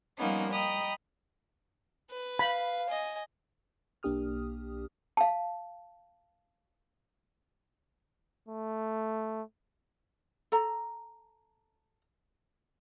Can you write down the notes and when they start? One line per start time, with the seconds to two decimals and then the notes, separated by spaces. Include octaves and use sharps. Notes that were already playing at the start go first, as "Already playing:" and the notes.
0.17 F3 G3 A#3 B3 C#4 D#4
0.52 D#5 G5 A#5 B5 D#6
2.10 B4
2.39 F5 B5
2.89 D#5 G#5
4.03 B1 A#3 D4 G4 D#6 F6
5.17 F5 A5
8.48 A3
10.52 A4 A#5